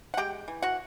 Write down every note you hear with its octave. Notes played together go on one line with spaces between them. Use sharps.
F#5
G#3 G4 G5
E3
F#4 F#5